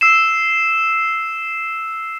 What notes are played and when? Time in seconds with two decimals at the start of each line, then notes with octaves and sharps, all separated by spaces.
0.01 E6 C7 E7